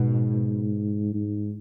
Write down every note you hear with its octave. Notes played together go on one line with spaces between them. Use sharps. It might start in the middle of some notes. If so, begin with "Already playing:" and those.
Already playing: G#2 B2
G#2